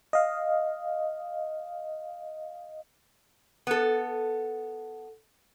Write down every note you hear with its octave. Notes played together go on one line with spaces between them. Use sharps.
D#5 F5
B3 A4